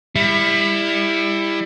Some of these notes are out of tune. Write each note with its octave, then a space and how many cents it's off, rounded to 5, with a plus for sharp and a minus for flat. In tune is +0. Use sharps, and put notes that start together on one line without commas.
G3 +35 E4 +10